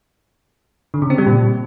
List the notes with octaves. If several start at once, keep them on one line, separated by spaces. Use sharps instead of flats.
D3
C#3
C4
G3
A#2